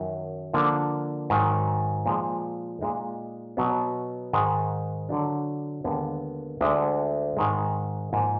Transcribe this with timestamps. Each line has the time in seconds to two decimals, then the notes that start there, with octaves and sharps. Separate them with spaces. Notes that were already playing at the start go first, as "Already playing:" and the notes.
Already playing: F#2 D#3 F#3
0.53 D3 F3 A#3 D4
1.30 G#2 D#3 F#3
2.06 A#2 F3 G#3
2.81 A#2 G#3 D#4
3.57 B2 F#3 B3
4.33 G#2 D#3 G#3
5.09 D3 F#3 D4
5.84 D#2 D3 G#3 B3
6.61 D2 D3 G#3
7.37 G#2 D#3 G#3
8.13 G#2 F3 A#3